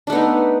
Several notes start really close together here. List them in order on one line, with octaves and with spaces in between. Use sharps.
D4 A3 B3 D#4